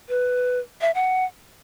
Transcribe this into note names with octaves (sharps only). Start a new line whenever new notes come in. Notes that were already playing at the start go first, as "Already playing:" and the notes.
B4
E5
F#5